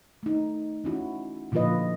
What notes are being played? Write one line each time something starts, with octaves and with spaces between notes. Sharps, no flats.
A3 D#4
E3 C#4 E4 F#4
A#2 D3 F3 F4 B4 D#5